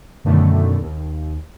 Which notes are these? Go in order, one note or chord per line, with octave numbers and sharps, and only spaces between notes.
F#2 B2 D3 D#3 A3
D#2